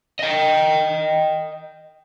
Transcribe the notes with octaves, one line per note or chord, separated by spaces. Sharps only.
D#5 G5